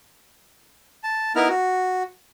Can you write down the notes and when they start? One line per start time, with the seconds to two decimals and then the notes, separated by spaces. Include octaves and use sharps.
1.04 A5
1.36 B3 D#4 E4 A#4 F6
1.48 F#4